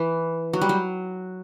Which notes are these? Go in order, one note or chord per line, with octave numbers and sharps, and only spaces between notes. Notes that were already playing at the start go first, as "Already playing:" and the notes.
Already playing: E3
F#3
G3
F#3